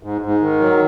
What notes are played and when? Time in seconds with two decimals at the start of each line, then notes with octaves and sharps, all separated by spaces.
0.03 G#2
0.21 G#2
0.41 D#3
0.60 F#3